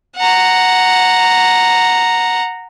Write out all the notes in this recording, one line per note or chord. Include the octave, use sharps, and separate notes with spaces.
F#5 A#5